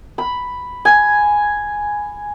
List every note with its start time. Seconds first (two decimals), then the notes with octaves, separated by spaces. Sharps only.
0.18 B5
0.85 G#5